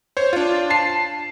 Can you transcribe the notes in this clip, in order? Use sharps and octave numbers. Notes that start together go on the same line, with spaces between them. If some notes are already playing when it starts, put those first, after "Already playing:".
C5 C#5
D4 F4
A5 C7